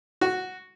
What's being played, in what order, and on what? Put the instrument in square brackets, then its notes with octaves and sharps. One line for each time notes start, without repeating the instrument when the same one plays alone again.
[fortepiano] F#4